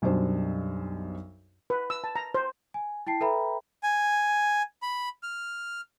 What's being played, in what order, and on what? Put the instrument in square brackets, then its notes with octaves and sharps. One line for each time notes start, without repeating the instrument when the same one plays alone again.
[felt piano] B1 F#2 G3 D4 C5
[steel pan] B4
E6
A5
A#5
C5
[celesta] G#5
E4 G5 A5 C7
A4 B4 E5 G5 A#5 B5
[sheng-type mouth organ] G#5
B5
F6